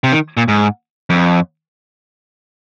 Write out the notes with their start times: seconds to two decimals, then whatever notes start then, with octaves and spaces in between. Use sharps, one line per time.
0.04 C3
0.13 D#3
0.37 A#2
0.48 G#2
1.10 F2